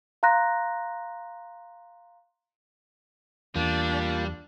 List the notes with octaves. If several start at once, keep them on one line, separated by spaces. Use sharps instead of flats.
F5 A#5 C6 F#6 A#6
E2 G3 A#3 D4 F4